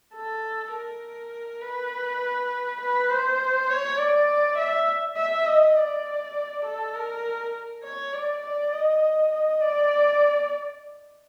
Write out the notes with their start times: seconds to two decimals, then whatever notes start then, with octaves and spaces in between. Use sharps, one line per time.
0.14 A4
0.73 A#4
1.62 B4
2.81 B4
3.10 C5
3.70 C#5
3.98 D5
4.58 E5
5.17 E5
5.47 D#5
5.76 D5
6.65 A4
6.95 A#4
7.83 C#5
8.13 D5
8.43 D5
8.72 D#5
9.31 D#5
9.61 D5